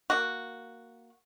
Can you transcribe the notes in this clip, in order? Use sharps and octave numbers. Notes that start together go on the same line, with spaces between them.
A#3 F#4